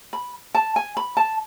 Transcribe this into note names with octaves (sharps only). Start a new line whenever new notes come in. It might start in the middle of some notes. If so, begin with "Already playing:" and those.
B5
A5
G#5
B5
A5